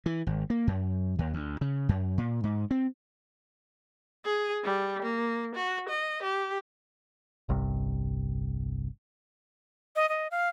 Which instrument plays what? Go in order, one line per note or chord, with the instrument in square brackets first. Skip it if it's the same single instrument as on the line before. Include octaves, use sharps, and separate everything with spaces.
[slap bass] E3
G#1
A#3
F#2
D#2
D2
C#3
F#2
A#2
G#2
C4
[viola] G#4
G3
A#3
F#4
D#5
G4
[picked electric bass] G1 C2 G2 C3
[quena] D#5
D#5
F5